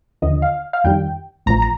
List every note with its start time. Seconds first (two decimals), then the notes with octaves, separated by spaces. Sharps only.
0.22 D#2 D3 F3 D#5
0.42 F5
0.73 F5
0.84 F2 D#3 G3 G5
1.46 A1 A2 F3 A#5
1.62 A#5